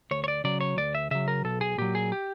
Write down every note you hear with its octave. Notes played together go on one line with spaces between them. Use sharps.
D2 C#5
C#5
D5
C#3 F#3 D5
C#5
D2 D5
E5
C#3 F#3 E5
A#4
B1 A4
G#4
A#2 F#3 G4
G#4
G4